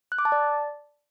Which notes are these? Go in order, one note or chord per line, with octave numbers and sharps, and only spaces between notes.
F#6
D6
A5
D5